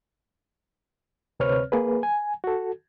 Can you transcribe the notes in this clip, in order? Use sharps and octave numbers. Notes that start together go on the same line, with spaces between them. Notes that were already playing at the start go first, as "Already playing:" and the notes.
D2 C3 C4 B4 C#5 F6
A#3 G#4 B4
G#5
F#4 A4